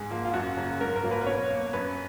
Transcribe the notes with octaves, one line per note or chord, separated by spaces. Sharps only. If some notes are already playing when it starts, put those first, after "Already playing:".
Already playing: G#2 G#4
F3 A#3
F4
F#2 F#4
C#3 F#3 A#3
G#2 A#4
A#4
F#3 A#3
B4
B4
B2 C#5
A#3
F#2 B4